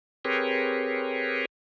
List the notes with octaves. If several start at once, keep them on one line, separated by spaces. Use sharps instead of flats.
C4 G4 G#4 A#4 B4 C#5